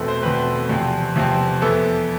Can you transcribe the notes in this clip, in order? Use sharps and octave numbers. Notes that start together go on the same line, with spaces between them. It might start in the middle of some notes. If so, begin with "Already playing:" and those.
Already playing: E2 B2 A3 C4 A4 B4
C5
E2 B2 A3 C4 B4
E2 C3 F3 C4
E2 C3 F3 C4
F2 E3 B3 A4